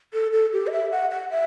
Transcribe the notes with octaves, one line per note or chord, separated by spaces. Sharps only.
A4
A4
G4
D#5
E5
F#5
F#5
E5